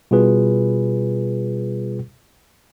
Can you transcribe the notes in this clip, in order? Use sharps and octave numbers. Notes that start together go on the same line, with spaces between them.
B2 G3 F4 G#4 B4